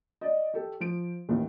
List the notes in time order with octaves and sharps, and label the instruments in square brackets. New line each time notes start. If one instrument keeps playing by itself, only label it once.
[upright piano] D5 D#5
G4 A4
F3 D7
A1 D#2 A#2